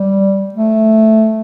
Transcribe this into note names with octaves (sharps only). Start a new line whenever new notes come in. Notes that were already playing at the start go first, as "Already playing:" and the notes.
Already playing: G3
A3